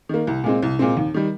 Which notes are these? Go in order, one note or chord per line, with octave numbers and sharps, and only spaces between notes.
D#3 A#3
C2
A#2 G#3 C4
C2
A#2 G#3 C4
D#2
D#3 G3